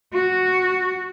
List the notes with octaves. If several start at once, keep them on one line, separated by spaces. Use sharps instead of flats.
F#4